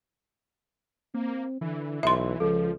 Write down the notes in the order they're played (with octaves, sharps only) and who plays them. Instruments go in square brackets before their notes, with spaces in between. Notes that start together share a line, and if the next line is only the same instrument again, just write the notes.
[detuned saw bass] A#3 [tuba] C4
[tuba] D3 [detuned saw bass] E3
[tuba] B1 [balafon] E5 C6
[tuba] C#2 [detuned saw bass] F3 [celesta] A4